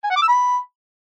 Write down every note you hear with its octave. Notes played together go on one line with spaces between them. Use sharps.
G#5
F#5
D6
E6
B5